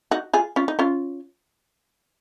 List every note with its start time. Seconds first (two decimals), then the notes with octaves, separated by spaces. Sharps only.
0.11 D#4 F#4
0.33 F4 G#4
0.56 C#4 F4
0.68 D#4
0.79 C#4 F4